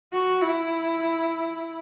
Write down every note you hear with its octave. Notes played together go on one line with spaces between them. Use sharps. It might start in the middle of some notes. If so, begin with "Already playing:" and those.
F#4
E4